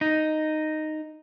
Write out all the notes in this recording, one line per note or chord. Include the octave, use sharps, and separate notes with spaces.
D#4